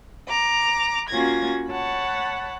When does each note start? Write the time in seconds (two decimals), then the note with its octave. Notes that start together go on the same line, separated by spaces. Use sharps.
0.28 A#5 D6
1.10 A#3 C#4 F4 F#4 G#6 A#6
1.71 C#5 F#5 A5 B5